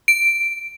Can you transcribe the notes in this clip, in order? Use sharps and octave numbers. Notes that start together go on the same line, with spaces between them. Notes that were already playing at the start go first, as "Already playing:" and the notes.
D7